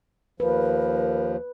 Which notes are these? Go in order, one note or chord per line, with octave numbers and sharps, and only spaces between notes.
D#2 F3 A#4 B4